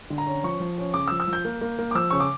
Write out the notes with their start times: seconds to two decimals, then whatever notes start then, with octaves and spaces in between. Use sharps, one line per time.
0.10 D3
0.18 A#5
0.26 C#4
0.44 F3 C#6
0.60 F3
0.78 C#4
0.94 C#3 D6
1.08 E6
1.11 F3
1.20 E6
1.27 F3
1.33 G6
1.45 A#3
1.61 A#3
1.79 A#3
1.91 D6
1.95 F3 E6
2.10 C#3 C#6
2.20 D6